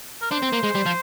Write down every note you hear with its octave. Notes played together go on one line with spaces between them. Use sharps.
A#4
D4 C5
C4
A#3
G#3
G3
F3